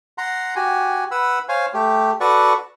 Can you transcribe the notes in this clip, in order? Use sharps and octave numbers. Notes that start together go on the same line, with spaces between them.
F#5 A#5 C6
F#4 G4 G#5
B4 F#5 B5 E6
C5 C#5 F5 G#5
A3 G4
F#4 A4 B4 D5 F#5 C#6